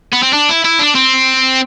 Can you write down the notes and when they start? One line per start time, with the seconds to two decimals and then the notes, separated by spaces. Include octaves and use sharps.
0.13 B3
0.23 C4
0.33 D4
0.49 E4
0.65 E4
0.80 D4
0.95 C4